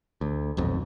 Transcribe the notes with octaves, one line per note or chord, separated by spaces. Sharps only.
D2
D#1 B1 F2